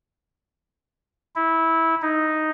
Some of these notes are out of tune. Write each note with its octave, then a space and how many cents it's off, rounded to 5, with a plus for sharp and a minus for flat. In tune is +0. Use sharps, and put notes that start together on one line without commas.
E4 -15
D#4 +0